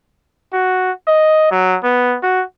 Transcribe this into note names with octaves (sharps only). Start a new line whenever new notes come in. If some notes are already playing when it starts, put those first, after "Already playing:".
F#4
D#5
F#3
B3
F#4